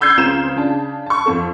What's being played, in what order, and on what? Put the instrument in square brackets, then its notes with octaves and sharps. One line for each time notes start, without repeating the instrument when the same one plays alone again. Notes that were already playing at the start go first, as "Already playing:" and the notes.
[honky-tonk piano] B5 E6 G6 G#6 C7
C#2 C#3 C4 F4 A#5 E7
C#3 D4 A5
A5 C#6
F2 C4 A4